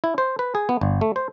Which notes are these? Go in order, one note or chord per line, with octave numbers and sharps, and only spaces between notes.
E4
C5
B4
G#4
B3
G1
A3
C5